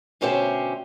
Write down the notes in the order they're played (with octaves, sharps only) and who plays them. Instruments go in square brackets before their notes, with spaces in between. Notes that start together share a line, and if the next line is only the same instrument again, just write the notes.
[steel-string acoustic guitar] D2 B2 C#4 G4 C5 E5